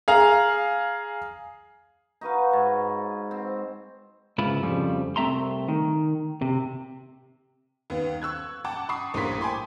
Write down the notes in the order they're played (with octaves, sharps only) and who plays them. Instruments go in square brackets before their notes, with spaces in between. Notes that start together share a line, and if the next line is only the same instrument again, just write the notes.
[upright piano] G#4 F5 A#5
[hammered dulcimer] D#4 F#4 B4 F5
G#2 C#5
C4
[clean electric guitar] C#2 G#2 C#3 E4 F4 B5
F2 C#3 F3 G3 A3
C2 A3 C4 E5 A#5 C6
D#3
C3
[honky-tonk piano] D#2 B3
C#6 E6 F#6 G#6
F#5 G5 A5 D6
B5 C#6 D#6 C7
A#1 A2 G3 A#3 C6 B6
G5 G#5 B5 C6 D6